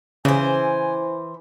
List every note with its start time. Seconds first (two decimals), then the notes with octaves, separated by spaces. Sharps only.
0.25 C#3 E3 C5 G#5